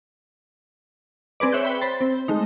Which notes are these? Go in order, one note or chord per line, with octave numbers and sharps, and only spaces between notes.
C4 G#4 B4 D5
C#5 E5 C6 F#6 G6
G5 B5
C5 B5 C6 A6
C4
G#3 A3 D#4